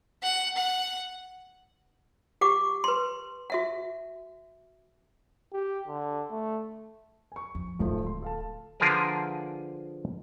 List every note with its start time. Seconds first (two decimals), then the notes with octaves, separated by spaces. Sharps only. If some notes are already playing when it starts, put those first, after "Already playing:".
0.22 F#5
0.56 F#5
2.41 G4 F#5 D6
2.84 B4 C6
3.50 F#4 E5 F#5
5.53 G4
5.87 D3
6.30 A3
7.32 G#5 C#6
7.55 F2
7.79 D1 G#1 D2 F3 A3
8.07 C6
8.22 A4 F5 A5
8.80 D3 F3 F4 G#4 A#4 B4